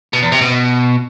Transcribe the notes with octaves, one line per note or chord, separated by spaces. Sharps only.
B2
E2
C3
B2